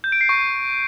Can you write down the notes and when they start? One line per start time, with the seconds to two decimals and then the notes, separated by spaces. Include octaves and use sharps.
0.04 G6
0.12 D7
0.21 C7
0.29 C#6